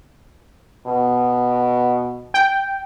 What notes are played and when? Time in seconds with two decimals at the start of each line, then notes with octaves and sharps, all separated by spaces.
0.87 B2
2.34 G5